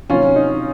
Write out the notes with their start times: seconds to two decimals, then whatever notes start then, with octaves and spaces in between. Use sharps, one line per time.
0.09 C3 D#3 F#3 A#3 C#4 F4
0.36 D#4